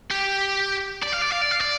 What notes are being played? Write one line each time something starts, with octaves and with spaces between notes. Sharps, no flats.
G4
D5
F5
D5
F5
D5
F5
D5